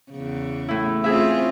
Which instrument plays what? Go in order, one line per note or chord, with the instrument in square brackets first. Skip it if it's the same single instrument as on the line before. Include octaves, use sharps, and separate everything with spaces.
[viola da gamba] E2 C#3
[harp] A2 E4
[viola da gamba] C4 C#4 F4 [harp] G#4 E5